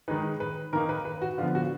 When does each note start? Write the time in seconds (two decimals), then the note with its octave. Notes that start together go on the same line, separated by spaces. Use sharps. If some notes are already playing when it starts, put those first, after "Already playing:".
0.08 D#3 G#3 D#4 B4
0.40 B4
0.73 D#3 A#3 D#4 A#4
0.89 B4
1.05 B4
1.22 F#4
1.38 D3 F3 B3 F4
1.55 F#4